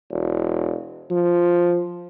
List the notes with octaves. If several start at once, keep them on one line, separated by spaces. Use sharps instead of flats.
E1
F3